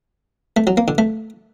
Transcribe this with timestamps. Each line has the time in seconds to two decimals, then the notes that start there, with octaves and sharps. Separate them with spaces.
0.57 A3
0.67 F#3
0.77 A#3
0.88 D3
0.98 A3